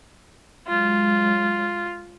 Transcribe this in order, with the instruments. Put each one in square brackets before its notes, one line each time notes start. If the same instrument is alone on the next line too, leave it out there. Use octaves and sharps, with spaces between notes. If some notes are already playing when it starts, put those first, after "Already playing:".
[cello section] F#3 G#3 [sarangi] F4